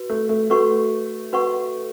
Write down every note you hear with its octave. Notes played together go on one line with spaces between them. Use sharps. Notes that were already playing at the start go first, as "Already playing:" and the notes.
Already playing: F#4 B4
A3
A3
A3 F#4 B4 F#5 C#6
F#4 B4 F#5 C#6